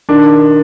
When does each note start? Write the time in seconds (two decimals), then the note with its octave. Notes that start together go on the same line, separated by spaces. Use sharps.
0.09 D#3 D4